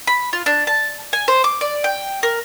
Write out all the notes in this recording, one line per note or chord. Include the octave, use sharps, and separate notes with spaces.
B5
F4
D4
A5
G#5
C5
D6
D5
G5
A#4